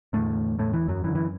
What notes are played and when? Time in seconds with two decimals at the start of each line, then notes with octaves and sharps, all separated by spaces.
0.13 E2 A2 D3 A3
0.59 A2 A3
0.73 E3
0.88 F#2 F#3
1.04 F#2 E3
1.08 D3
1.15 E3